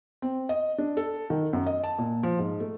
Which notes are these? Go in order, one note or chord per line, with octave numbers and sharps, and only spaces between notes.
C4
D#5
D4
A4
D#3
F#2
D#5
A5
A#2
F3
G#2
A3